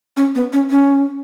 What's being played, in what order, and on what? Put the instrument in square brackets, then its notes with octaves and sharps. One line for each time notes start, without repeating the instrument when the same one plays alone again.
[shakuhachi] C#4
B3
C#4
C#4